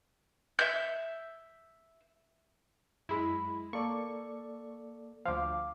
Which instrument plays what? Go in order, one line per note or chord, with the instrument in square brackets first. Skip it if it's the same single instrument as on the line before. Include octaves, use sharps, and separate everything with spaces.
[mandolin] E5 G6
[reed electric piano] F#2 B5 [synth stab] G#3 E4
[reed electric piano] A#3 A4 D5 [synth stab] C#6
[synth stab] D2 F3 [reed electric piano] F5 D6